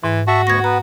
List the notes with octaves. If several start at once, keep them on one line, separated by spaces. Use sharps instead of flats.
G#2 E3
F#4 E5 A5 C#6
D2 B3 C#6 G#6 A#6
B3 B4 A#5